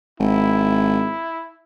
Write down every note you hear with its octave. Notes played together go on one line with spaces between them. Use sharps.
G#1 E4